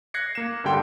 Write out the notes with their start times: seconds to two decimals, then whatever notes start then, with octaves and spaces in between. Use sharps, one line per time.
0.14 F#6 G#6 A#6 C7 C#7
0.35 A#3 E7
0.64 C#2 G2 D3 G4 G5 C6